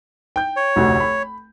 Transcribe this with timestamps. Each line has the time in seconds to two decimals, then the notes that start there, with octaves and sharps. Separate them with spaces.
0.36 G5 G6
0.56 C#5
0.76 F1 D2 F#4
1.00 B5